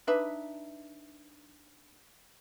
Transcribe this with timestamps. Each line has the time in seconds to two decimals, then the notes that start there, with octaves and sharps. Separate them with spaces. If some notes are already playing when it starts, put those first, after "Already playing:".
0.07 D4 D#4 B4 E5